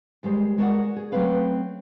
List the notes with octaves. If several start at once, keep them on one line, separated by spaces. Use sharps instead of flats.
D#2 G3 G#3 C5
G#3 F#4 A#4 C5 D5 F#5
G#4
F#3 A3 C4 C#4 B4 F5